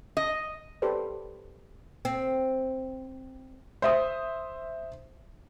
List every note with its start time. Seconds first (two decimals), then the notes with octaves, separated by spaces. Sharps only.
0.17 D#5
0.82 G4 A4 B4 C5 D5
2.05 C4
3.82 C5 E5 D#6